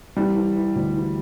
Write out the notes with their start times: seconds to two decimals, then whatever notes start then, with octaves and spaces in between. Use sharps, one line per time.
0.17 E3 G3
0.36 E3
0.56 E3
0.76 D2
0.96 E3